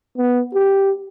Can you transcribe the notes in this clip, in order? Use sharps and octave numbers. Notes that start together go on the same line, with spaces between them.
B3
G4